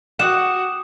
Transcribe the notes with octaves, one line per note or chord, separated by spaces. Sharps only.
F#4 F#5 G5 D6 D#6 E7